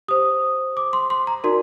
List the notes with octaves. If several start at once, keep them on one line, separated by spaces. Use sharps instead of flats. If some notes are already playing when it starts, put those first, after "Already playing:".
G4 C5 D#6
D6
C6
C6
A#5
D#4 F#4 A#4 D5 C6